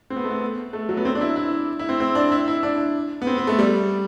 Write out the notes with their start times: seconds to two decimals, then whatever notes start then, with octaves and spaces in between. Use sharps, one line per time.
0.10 C4
0.16 B3
0.24 A3
0.31 B3
0.73 A3
0.89 F#3
0.97 B3
1.05 C4
1.15 D4
1.21 E4
1.36 E4
1.79 E4
1.89 C4
2.00 C4
2.15 D4
2.32 E4
2.48 E4
2.63 D4
3.22 B3
3.27 C4
3.38 B3
3.47 A3
3.59 G3